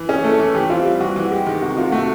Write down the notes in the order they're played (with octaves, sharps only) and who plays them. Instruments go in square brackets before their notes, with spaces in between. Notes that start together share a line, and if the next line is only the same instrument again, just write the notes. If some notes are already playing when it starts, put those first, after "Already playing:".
Already playing: [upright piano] E3
[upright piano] C#4 [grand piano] G#4
[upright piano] A3 [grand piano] A4
[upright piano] E3
[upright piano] E3 [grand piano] G4
[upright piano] C4 [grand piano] F4
[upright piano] G3
[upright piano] E3 [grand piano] F#4
[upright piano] E3
[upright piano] G#3 [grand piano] G4
[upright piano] D#3
[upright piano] C3 [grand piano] F#4
[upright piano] C3 [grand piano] F4
[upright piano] A3 [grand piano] F#4